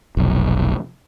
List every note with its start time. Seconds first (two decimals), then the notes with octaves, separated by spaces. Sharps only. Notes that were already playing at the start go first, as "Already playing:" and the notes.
0.17 F1 B1